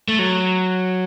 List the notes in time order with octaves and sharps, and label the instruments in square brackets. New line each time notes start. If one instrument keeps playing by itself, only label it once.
[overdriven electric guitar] A3
F#3